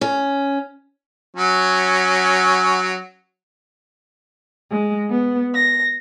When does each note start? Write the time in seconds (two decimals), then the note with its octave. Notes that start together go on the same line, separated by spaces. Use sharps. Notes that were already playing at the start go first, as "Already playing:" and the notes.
0.01 C#4
1.36 F#3 C#4
4.70 G#3
5.10 B3
5.53 A#6